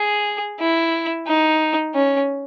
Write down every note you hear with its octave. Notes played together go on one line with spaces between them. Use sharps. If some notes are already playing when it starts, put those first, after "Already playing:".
Already playing: G#4
E4
D#4
C#4